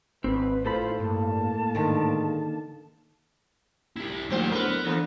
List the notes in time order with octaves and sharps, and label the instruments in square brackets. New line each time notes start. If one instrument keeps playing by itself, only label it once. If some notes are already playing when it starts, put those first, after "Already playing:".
[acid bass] G#1 [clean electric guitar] C4 [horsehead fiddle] B4
[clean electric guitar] A2 A4 B5 [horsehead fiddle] F4 C5
[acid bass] G2 [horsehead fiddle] A#3 A5
[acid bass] G#2 [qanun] D3 D#3
[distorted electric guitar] E4 G4
[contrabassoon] D#1 [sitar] F3 C5 [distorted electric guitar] A3 F#5
[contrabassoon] D1 [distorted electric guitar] B3 [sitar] A#4 B4
[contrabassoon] D3 [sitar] E3